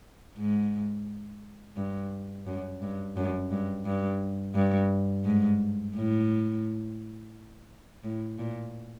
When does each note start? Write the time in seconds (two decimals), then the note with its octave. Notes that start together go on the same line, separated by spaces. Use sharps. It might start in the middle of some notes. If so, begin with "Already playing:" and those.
0.37 G#2
1.76 G2
2.47 F#2
2.82 G2
3.17 F#2
3.51 G2
3.85 G2
4.55 G2
5.25 G#2
5.95 A2
8.04 A2
8.39 A#2